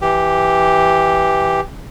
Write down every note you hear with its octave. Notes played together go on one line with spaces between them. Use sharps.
E3 G4